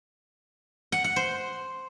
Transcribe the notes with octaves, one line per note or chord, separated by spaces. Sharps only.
F#5
F#5
C5